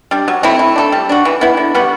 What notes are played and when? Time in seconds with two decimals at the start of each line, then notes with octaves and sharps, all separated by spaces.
0.11 G3 D4
0.28 F#3
0.43 A3 C4 E4
0.59 A3
0.76 D4 F#4 A4
0.92 G3
1.09 D4 F#4
1.25 E3
1.41 B3 E4
1.57 D3
1.75 G3 B3 F#4